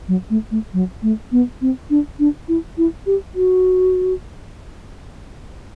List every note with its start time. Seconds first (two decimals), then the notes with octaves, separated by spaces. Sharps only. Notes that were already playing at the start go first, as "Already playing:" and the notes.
0.08 F#3
0.30 A3
0.51 A3
0.73 F#3
1.03 A3
1.32 B3
1.61 C4
1.90 D4
2.19 D4
2.48 E4
2.78 E4
3.06 G4
3.35 F#4